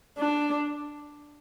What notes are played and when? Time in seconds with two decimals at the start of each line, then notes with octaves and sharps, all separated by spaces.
0.18 D4